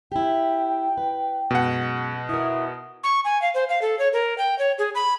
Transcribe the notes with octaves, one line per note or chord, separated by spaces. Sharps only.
E4 G4 G5
B4
F#2 B2 G#3 F#5
E4 A#4 D#6
C#6
G#5
F5
C5
F5
A4
C#5
A#4
G5
C#5
G#4
B5